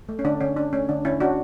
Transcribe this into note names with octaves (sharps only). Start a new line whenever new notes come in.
A3
C#4
D3 D4
D3 C#4
C#4 D4
A3 C#4
D3 D4
D3 C#4 E4
C#4 D4 F#4